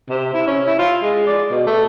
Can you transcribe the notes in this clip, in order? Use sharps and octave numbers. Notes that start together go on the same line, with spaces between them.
C3
E4
C#4
E4
F4
G#3
D5
B2
A3